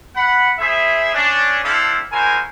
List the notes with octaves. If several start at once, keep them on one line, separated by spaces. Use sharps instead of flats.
F#5 B5
E4 G#4 C5 E5
C#4 D4
C4 D4 E4 A4 F5
G#3 E4 F#4 A#4 C5 G#5